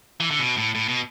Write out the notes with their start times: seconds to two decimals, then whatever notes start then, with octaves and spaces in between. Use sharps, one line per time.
0.20 E3
0.31 D3
0.39 B2
0.57 A2
0.75 A2
0.88 B2